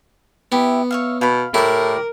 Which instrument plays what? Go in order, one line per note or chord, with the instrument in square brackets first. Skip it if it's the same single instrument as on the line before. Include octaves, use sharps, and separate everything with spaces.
[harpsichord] B3 [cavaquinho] E4 G4 E5
[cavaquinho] C#5 E5 F5
[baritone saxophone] B2 [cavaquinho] F5 B5
[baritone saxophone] A2 [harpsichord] E4 [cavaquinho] G4 D5 [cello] A#4